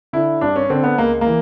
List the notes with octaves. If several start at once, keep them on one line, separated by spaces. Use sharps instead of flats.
D3 E4
G2 D4
C#4
D3 C4
B3
C#2 A#3
A#3
E3